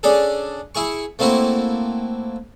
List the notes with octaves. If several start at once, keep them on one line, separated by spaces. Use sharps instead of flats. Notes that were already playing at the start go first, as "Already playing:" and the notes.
C#4 D4 G#4 A4
E4 G#4 C#6
A3 A#3 C4 E4 F#4